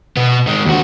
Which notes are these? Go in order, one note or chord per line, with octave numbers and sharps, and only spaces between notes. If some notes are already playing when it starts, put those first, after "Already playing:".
B2 B3
D#3 G#3
D#2 F#4